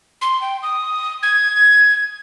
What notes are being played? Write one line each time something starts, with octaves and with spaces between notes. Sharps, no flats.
C6
G5
D#6
G#6